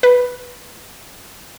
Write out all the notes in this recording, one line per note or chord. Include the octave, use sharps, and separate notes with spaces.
B4